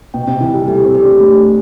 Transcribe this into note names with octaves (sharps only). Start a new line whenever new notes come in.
B2 G5
C3
E3 E4
G3
A3 G4
C4
G4
D4
A3